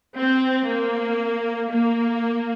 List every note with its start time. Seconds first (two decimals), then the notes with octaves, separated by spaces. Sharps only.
0.17 C4
0.68 A#3
1.72 A#3